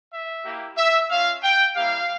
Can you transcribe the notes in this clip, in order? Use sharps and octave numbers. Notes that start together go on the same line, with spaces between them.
E5
A#3 E4 G4
E5
C#4 F4 F5
G5
G3 A#3 E4 G4 F5